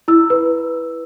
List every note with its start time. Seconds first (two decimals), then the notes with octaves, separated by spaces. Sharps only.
0.08 E4 E6
0.30 B4